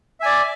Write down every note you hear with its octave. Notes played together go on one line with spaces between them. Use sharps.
D5 E5 G#5